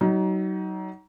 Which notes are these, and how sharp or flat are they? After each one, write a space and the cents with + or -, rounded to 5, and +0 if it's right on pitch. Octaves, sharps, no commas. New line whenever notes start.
F#3 +35 D#4 +15